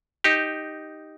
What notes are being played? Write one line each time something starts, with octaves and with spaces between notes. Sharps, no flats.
D#4 G4